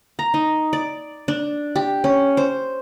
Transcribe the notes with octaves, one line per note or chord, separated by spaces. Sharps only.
A#5
D#4
D5
D4
G4
C#4
C5